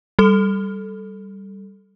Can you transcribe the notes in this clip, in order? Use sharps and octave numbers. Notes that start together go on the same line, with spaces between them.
G3 A4